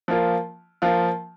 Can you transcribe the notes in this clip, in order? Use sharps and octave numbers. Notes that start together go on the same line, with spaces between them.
F3 A#3 F4
F3 A#3 F4